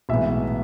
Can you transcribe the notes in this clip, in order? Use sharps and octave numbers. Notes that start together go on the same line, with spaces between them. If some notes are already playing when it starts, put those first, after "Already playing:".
B1 A2 E3 G#3 B3 E5